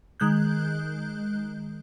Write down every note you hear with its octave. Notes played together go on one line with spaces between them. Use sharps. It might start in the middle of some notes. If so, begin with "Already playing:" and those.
D#3 G#3 F#6 G6